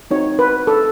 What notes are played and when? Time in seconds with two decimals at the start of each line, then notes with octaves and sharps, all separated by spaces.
0.11 C4 D#4 F#4 C#5
0.39 B4
0.67 A4